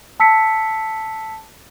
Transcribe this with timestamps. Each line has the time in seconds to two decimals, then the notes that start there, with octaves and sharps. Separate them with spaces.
0.20 A5 E6 B6 C#7